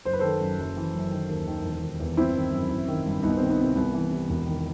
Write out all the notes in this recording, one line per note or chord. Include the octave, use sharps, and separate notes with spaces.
F#1 C5
B4
D#3 A4 C5
F#2
F#1
E3
F#2
D#3
D#2
D#3
E1
D#3
E2
G1 C4 E4
D#3
F#2
A1
D#3
G2
C2 B3 D#4
D#3 C4
B3 D#4
C3
C4
C2 B3
E3
C3
E1
D#3